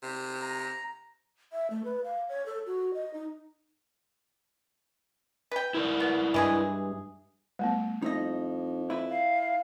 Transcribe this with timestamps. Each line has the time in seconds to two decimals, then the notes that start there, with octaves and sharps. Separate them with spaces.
0.03 C3
0.41 A#5
1.53 E5
1.70 A3
1.84 B4
2.04 F5
2.29 C#5
2.46 A4
2.66 F#4
2.94 D#5
3.14 D#4
5.51 B4 G5
5.74 E4 A#4 D5
6.00 B3
6.34 G2 E3 G#3 G#4
7.59 G3 A3 B3
8.02 F2 D#4 E4 D#5
8.90 E4 B4
9.10 F5